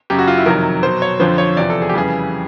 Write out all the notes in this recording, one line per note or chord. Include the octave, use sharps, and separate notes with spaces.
F#2 C#3 F#3 G4
F#4
F4
E4
F2 C3 D#3 F#3 A#4
B2 F#3 C5
C#5
F2 D3 F3 C5
C#5
E2 C3 F3 D5
A4
G#4
G4
F2 C#3 E3 G3 G#4